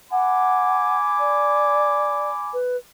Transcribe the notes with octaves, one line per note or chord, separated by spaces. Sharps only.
F#5 G#5 B5 D6
D5
B4